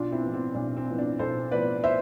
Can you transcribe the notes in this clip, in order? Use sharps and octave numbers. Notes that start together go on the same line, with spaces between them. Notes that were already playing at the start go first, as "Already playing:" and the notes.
Already playing: B1 D4 F4
C4 E4
A2 F3 B3
C4
B1 D4
C4
A2 F3 B3
D4
B1 A4 C5
A2 F3 B3 B4 D5
C5 E5